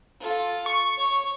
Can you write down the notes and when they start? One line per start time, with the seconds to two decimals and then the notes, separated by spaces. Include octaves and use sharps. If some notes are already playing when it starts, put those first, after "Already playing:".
0.20 F4 A4
0.66 C#6
0.96 C#5